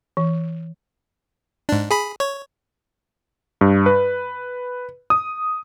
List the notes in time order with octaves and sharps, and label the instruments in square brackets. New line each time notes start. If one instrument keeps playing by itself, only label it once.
[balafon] E3
[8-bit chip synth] G#2 D4
G#4 B5
C#5
[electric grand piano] G2
B4
D#6